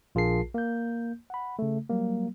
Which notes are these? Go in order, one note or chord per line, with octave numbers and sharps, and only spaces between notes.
A#1 F4 G#4 A#4 A5 C7
A#3 G6
F#5 B5
C#3 A3
F#3 G3 A#3